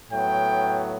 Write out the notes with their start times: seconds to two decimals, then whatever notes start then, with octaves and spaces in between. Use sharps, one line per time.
0.11 A2 F#3 B3 G5